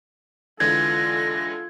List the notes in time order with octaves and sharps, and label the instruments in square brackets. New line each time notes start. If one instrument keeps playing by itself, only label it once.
[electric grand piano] D3 E3 G#3 [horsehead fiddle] F4 A4 [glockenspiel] G#6 [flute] A#6